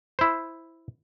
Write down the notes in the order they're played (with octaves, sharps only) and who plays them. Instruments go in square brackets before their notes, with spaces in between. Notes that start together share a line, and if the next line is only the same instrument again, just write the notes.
[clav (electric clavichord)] E4 C5